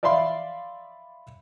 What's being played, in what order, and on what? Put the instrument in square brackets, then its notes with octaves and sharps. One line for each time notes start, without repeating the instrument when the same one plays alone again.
[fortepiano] D5 E5 F5 B5 C6